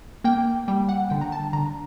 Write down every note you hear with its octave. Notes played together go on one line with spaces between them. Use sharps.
A#3 G5
G3 G5
F#5
D3 G5
A#5
A5
D3 A#5